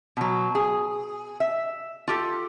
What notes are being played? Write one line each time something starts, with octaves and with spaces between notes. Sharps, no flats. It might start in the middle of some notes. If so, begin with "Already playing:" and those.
B2 F#3
G#4
E5
F4 G4 A4